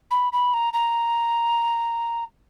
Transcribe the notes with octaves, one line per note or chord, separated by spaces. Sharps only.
B5
B5
A#5
A#5